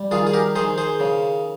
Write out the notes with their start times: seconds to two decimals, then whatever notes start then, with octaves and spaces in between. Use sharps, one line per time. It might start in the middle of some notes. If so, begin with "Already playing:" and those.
Already playing: G3
0.11 D#3 F4 G#4
0.27 G#4
0.34 G4 A#4
0.55 D#3 G#4 C5
0.78 G#4 C5
1.00 C#3